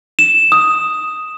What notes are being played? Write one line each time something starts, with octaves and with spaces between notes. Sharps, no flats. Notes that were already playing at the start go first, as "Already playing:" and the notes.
E7
D#6